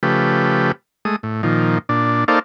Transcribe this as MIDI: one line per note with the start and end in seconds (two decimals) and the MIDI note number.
0.03 0.72 49
0.03 0.72 53
0.03 0.72 57
0.03 0.72 67
0.03 0.72 71
1.05 1.16 56
1.05 1.16 57
1.05 1.16 87
1.23 1.42 45
1.43 1.78 46
1.43 1.78 51
1.43 1.78 53
1.89 2.24 46
1.89 2.24 62
2.28 2.39 58
2.28 2.39 63
2.28 2.39 69
2.28 2.39 72
2.28 2.39 74
2.28 2.39 77